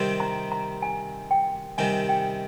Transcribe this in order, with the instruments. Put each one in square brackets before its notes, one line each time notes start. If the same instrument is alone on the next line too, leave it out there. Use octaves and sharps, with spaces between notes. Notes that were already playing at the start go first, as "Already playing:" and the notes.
Already playing: [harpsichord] C3 D#3 G3 C4
[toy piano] A#5
A#5
G#5
G5
[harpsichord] C3 D#3 G3 [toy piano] G#5
[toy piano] G5